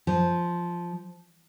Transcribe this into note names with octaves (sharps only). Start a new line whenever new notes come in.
F3